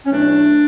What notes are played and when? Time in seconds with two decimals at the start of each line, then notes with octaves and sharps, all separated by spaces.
0.05 C#4
0.11 E2 B2 F#3 A3 D4